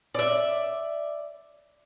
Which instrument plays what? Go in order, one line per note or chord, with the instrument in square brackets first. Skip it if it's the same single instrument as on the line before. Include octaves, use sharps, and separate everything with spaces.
[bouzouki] D5 E5